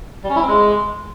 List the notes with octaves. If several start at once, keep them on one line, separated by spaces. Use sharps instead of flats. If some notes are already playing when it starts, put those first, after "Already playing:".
G3
C#4
E4
C4
G#3